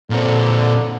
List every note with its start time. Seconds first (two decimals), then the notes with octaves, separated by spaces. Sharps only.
0.10 A#2 D3 C4